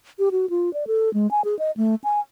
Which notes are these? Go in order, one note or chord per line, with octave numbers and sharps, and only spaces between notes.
G4
F#4
F4
D5
A4
G#3
G#5
G#4
D#5
A3
G#5